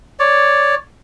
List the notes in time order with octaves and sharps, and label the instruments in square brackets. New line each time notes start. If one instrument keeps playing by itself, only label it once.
[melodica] C#5 D5